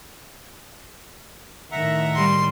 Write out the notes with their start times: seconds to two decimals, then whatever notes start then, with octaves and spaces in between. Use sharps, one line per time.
1.72 A2 D#3 E5 F#5 A#5
2.16 G3 C6